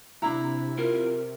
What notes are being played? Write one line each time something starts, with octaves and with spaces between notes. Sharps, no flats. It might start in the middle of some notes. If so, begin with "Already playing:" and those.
C3 D4 E4 A#5
F4 A#4